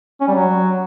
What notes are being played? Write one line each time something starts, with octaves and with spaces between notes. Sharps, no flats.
C#4
G3
F#3